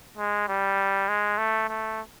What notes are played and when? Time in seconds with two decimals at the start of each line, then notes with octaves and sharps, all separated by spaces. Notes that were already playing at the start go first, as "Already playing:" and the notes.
0.17 G#3
0.48 G3
1.09 G#3
1.38 A3
1.69 A3